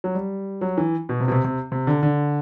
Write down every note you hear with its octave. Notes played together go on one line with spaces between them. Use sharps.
F#3
G3
F#3
E3
B2
C3
B2
C3
C3
C3
D3
D3